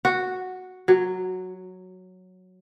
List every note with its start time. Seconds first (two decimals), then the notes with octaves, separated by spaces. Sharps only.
0.05 F#4
0.88 F#3